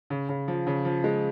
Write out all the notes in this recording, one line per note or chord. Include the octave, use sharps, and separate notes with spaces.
C#3
C#3
F3
C#3
F3
G#3